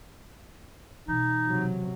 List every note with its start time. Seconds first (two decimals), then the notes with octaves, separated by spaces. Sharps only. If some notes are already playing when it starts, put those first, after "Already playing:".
1.08 B2 E3 D#4
1.48 C3 F#3